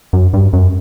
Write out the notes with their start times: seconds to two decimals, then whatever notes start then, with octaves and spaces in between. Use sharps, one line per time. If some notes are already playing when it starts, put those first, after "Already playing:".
0.13 F#2
0.33 G2
0.53 F#2